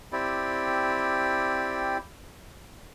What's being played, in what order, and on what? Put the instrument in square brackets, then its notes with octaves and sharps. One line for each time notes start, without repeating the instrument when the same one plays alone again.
[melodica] C4 E4 G4 D5